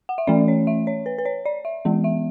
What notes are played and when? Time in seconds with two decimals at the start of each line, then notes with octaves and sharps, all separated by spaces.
0.09 F#5
0.18 E5
0.27 E3 A3 C#4 D5
0.48 C#5
0.67 E5
0.87 C#5
1.06 B4
1.18 B4
1.25 C#5
1.45 D5
1.65 E5
1.85 E3 G#3 B3
2.04 E5